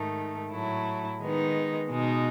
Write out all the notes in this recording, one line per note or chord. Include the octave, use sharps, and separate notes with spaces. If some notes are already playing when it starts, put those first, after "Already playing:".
Already playing: G#2 D#3 A3 D#4
A2 F#3 A3 E4
D#3 G#3 B3 D#4
B2 G#3 D#4